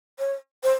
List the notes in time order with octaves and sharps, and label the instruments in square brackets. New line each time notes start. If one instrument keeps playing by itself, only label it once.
[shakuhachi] C#5
C5